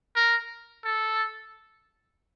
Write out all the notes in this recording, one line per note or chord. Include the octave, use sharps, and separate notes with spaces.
A#4
A4